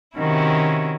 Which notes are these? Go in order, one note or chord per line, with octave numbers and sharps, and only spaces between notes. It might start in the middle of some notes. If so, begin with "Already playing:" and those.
C3 D#3 C#4 E4 F#4